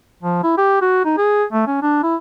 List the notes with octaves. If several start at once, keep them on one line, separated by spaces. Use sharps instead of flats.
F3
E4
G4
F#4
D#4
G#4
A3
C#4
D4
E4